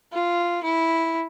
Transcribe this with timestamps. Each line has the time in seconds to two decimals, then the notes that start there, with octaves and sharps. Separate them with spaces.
0.13 F4
0.64 E4